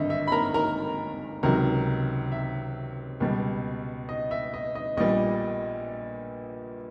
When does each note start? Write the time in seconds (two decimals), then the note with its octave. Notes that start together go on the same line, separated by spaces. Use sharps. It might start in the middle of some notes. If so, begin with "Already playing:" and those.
Already playing: G#1 G2 D3 D#5 E5
0.10 E5
0.27 B5
0.32 A#4 A#5
0.54 A#4 A#5
1.43 C#2 C3 D#3 F#3 A#4 A#5
2.32 E5
3.20 C#2 B2 G3 B3
4.09 D#5
4.31 E5
4.54 D#5
4.75 D#5
4.97 A#1 A#2 G3 B3 D#5